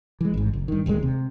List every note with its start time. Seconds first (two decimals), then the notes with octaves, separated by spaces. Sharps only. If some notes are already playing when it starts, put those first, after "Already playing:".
0.21 E3 G#3
0.34 G#1 G#2
0.53 F#1
0.68 G2 D#3
0.86 D#1 D#2 A#2 G#3
1.03 C3